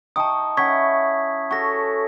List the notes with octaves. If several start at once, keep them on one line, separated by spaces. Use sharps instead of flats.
D#4 G5 A5 C#6 D#6
C#4 E4 F#5 C#6 G#6 B6
F#4 A4 C#5 C#6 A#6